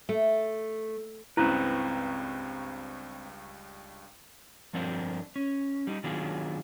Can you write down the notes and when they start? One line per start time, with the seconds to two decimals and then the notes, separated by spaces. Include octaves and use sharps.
0.09 A3
1.37 C#2 G2 C4 C#4 E4 B4 A#5
4.73 G2 F3 C4 D4 A#4 C5
5.36 C#4
5.87 G3 D#4
6.04 D#3 F#3 B3 D4 F4 G#4